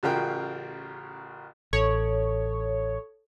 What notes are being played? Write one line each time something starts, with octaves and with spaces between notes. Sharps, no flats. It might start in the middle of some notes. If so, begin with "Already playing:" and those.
A1 C#3 F4 F#4 A#4 G5
A1 A4 C#5